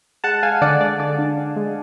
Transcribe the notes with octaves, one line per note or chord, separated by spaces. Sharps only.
G#3 F#5 A5
G#3 F5 G#5
D3 D5 F#5
G#3 D5
D3 D5
D4
D4
G#3